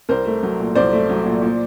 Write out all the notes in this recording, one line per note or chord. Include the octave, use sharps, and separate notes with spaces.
C2 A#4 C5
A3
F#3
A#2
C2 C5 D5
A3
F#3
A#2
A#2